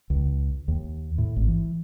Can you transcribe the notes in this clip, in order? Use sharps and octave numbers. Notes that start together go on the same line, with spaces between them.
C#2
D#2
A2
G#1
E3